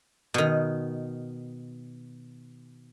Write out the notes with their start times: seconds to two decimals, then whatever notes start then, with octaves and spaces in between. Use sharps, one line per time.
0.34 B2 D#3